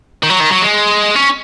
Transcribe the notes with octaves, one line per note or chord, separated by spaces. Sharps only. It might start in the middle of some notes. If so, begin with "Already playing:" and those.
D#3
F#3
D#3
F#3
G#3
C#4